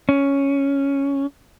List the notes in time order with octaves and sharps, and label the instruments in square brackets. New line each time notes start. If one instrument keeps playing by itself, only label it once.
[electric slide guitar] C#4